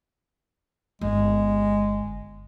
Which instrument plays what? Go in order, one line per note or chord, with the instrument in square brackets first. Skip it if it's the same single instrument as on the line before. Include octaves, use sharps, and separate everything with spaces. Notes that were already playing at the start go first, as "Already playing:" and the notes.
[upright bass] G1 [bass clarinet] G#3